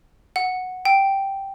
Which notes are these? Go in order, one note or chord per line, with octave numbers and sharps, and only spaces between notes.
F#5
G5